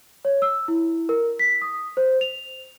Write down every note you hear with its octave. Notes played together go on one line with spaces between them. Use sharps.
C#5
E6
E4
A#4
B6
D#6
C5
F7